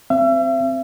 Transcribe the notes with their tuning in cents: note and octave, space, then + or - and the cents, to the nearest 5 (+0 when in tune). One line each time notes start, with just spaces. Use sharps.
C4 +0 E5 +40